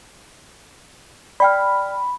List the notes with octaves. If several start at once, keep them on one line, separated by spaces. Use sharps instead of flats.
D5 G5 B5 F6